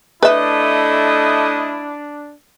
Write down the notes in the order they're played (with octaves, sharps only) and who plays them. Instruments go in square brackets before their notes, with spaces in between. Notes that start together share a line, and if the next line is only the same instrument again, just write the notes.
[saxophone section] A3 D#5 [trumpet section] D4 [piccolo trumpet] E4 [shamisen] B4 E5